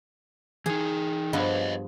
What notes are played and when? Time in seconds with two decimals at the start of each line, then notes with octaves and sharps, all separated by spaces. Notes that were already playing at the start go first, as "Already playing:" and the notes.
0.66 E3 D#4 G#4
1.33 G2 F3 B3 B4 C#5 D#5